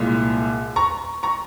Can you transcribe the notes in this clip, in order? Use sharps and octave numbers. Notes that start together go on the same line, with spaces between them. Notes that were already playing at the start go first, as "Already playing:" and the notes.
Already playing: C2 A#2 G#3
A#5 C#6
A#5 C#6